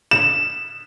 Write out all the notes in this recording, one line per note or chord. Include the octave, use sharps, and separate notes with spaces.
E7